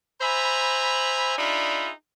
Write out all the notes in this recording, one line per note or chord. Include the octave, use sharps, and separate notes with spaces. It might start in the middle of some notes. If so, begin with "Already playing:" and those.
C5 E5 G#5 A#5 B5
D4 D#4 F4 G#4 E5 B5